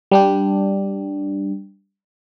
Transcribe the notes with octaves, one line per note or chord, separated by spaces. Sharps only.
G3 D4 G4